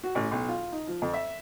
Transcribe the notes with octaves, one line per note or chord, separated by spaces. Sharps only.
F#4
A1
B1
F4
D#4
F3
F2
E5